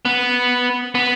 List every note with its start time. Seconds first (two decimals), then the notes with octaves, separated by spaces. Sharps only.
0.05 B3
0.95 B3